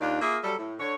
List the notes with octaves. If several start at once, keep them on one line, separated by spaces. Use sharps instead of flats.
D#2 D#3 D4 F4 D5
A#3 F4 G#4 A#4 E5
F#3 G3 A4
A2
D3 C#5